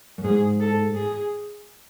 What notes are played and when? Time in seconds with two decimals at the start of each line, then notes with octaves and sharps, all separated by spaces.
0.18 F#2
0.24 G#2 G#4
0.60 A4
0.95 G#4